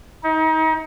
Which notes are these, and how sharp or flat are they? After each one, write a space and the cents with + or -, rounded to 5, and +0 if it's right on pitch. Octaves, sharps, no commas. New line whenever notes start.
D#4 +35